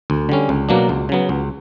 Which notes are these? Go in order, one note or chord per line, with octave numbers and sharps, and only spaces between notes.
D2
D3 G3 C#4
C#2
B2 F#3 A#3 D4
C#2
C#3 F#3 B3
C#2